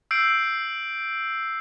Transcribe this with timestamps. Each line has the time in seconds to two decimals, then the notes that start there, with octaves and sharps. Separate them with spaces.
0.11 E6 G6 C7 D7